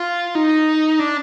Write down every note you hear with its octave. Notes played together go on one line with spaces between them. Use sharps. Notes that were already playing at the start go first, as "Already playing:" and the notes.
Already playing: F4
D#4
D4